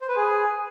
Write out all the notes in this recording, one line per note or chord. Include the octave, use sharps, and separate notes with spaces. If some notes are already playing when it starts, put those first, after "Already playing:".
C5
B4
G#4